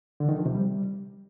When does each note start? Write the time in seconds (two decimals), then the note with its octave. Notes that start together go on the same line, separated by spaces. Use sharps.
0.20 D3
0.29 D#3
0.37 F3
0.46 C3
0.54 G3